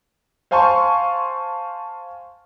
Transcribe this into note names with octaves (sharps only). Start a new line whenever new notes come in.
C5 F5 G#5 A5 C6 C#6